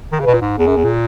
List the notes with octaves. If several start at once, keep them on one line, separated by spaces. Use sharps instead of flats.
D#3
C#3
B2 B4
A#2
G#2
E2 G#4
F#2
E2
A#2